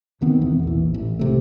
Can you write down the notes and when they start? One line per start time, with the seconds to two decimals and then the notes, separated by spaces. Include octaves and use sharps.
0.21 E2 D#3 B3 C4
0.41 E1 E2
0.63 A#1 E3
0.94 A1
1.19 C2 C3 A3